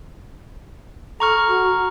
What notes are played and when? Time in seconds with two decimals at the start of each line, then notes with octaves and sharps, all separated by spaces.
1.20 A4 A#5 C#6 F6
1.48 F#4